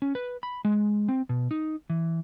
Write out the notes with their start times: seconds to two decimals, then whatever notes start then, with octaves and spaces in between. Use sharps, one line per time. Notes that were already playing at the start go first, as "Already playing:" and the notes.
0.02 C#4
0.15 B4
0.43 B5
0.65 G#3
1.08 C4
1.29 B2
1.51 D#4
1.90 E3